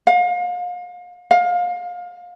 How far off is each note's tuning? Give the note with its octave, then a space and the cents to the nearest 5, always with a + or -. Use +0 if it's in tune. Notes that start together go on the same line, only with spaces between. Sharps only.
F5 +35
F5 +25